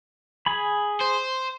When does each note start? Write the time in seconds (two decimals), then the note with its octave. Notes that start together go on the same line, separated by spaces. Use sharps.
0.46 G#4 G#5 B5
1.00 C5